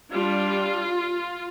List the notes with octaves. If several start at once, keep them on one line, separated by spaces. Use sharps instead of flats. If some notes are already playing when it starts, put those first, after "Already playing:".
G3 D4 F4